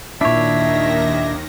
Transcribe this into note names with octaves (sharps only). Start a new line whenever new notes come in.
D#2 A#2 D#3 D4 E4 C#5 E5 A#6